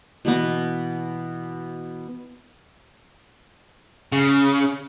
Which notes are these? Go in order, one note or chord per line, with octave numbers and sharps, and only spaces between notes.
B2 E3 B3
C#3